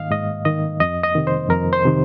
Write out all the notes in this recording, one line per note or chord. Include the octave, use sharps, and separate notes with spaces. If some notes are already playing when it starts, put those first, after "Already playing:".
Already playing: G#2 D#3 D#5 F5
G#2 D#5
D#3 D#5
F2 D#5
D#5
C3 D#3
C5
F2 A#4
C5
C3 D#3